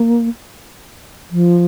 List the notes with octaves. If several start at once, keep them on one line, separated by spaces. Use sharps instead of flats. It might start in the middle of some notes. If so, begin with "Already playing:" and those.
Already playing: A#3
F3